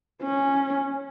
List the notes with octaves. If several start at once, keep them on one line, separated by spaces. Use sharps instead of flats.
C#4